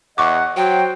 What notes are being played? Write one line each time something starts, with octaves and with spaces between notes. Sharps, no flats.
E2 D#5 F#5 C#6 D6
F#3 F#4 C5 G5